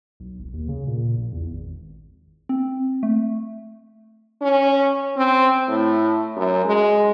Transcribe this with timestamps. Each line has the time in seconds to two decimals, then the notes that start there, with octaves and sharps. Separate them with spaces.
0.20 B1
0.40 E1
0.53 D#2
0.68 C#3
0.87 A#2
1.17 A#1
1.33 E2
1.50 G#1
2.49 C4
3.03 A3
4.42 C#4
5.17 C4
5.69 A2
6.36 F#2
6.66 G#3